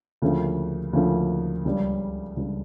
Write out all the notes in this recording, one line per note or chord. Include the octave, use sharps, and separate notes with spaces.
D2 C#3 F3 A#3
D2 C#3 F3 A#3
C#2 C#3 G3
C#2 C#3 G3